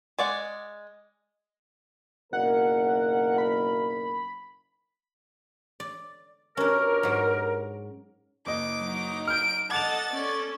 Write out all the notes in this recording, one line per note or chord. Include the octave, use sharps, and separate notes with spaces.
G#3 D5 F#5
F#1 B1 A#4 F#5
B5
D5
B2 C#4 D4 G4 A#4
G#2 F#3
F#1 D#5 D6
F#3 D#4
F6 G6 D7
A4 D#5 F#5 A5 D6 A6 F7
C#4 A4 D5